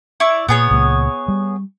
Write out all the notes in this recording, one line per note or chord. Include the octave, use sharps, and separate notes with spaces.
E4 D5 C#6
A#2 B3 G#4 C#5
C#2 A#2
G3